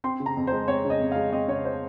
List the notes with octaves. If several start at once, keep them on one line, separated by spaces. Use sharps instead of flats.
C4 C6
C#3
A#5
F2
C5
G#3
C4 C#5
C#3
D#5
F2
F5
G#3
C4 D#5
C#3 C#5
C5